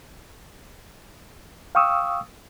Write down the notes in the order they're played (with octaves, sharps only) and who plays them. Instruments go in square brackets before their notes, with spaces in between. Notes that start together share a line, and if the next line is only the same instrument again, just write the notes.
[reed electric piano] F5 G5 C#6 D#6 E6